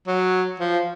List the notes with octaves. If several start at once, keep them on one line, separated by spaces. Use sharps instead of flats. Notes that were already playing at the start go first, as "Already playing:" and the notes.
F#3
F3